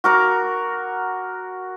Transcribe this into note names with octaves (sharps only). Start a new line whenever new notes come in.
F#4 A#4 D6